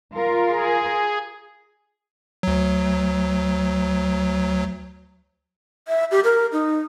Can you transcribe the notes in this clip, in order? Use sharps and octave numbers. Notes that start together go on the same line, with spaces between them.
F4 A#4
G#4
D2 F#3
E5
G4
A#4
D#4